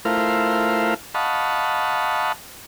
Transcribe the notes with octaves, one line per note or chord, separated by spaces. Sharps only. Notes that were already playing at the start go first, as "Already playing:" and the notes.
A3 E4 F4 A#4 C5 F5
D#5 F5 F#5 A5 B5 C#6